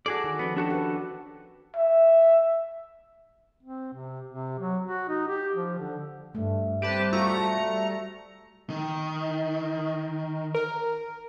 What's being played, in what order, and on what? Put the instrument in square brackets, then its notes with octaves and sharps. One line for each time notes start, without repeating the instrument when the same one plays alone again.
[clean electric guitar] F#4 G#4 D5 [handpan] A4
[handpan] D#3
[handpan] F3 C#4 [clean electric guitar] B3
[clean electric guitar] D4 F#4 A4 [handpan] G4
[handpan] B4 F#5
[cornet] E5
[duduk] C4
C3
C3
F#3
F#4
D#4
G4
F3
D3
[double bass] G2 [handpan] A3
[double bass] G3 C4 [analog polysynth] G4 B4 A5
[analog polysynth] A3 A#5 C#7 [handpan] F4 F#4
[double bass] G3
[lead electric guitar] D#3
[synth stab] A#4